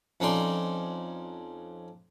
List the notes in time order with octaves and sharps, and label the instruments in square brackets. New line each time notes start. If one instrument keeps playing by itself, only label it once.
[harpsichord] F2 C#4 D#4 D5 C6